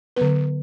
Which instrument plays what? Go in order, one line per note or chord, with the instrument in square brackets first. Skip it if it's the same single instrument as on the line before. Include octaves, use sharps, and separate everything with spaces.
[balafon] D3 F#3 B3 B4